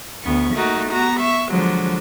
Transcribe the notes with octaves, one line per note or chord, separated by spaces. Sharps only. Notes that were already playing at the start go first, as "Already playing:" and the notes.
D2 B3 C#6
A3 A#3 D#4 F#4
B3 F#4 A#5
E5 C#6
D3 F3 F#3 G#3